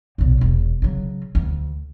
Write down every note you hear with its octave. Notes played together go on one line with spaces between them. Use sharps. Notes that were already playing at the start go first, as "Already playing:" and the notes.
B1 A#2
E1
C#3 F#3
D2